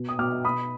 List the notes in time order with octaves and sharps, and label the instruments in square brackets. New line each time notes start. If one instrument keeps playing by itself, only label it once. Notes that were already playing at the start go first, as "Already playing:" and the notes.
Already playing: [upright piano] B2
D#6
B2 D6 F6
B2 B5 D#6